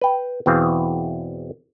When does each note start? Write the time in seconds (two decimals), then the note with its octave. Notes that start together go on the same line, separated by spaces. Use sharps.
0.01 B4 G5
0.46 E2 B2 E3 C4 G#4 F5